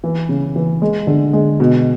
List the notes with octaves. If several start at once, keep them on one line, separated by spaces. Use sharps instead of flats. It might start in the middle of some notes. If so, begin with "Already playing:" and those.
E3
C#3
E3
G#3
D3
G#3
B2